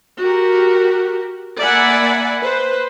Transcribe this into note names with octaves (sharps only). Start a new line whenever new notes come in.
F#4 G4 A#4
A#3 D5 E5 F#5 G#5 B5
B4 C5